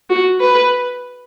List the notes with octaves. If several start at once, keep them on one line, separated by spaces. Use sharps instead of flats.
F#4
B4